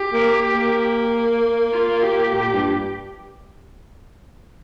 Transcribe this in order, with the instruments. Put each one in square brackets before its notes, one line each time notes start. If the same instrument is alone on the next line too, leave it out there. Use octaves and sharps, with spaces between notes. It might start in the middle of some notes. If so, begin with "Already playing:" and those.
Already playing: [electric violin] G4
[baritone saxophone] A#3
A#3
[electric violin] F4
G4
[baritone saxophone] A#2
G2